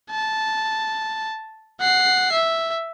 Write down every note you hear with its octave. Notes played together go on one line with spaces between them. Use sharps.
A5
F#5 C7
E5